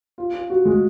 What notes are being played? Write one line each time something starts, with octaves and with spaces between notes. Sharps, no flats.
F4
F4
F#4
G#3